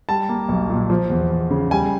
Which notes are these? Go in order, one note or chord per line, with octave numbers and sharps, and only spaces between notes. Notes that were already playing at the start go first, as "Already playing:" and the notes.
G3 A5
A#3
B1
A#2
F3
E2
E2
C#3
G3 G#5